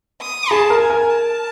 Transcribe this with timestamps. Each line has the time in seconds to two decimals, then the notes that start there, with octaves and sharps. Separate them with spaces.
0.21 D#6
0.51 G#4 A5
0.70 A#4
0.80 G#5
0.90 A#4
1.10 A5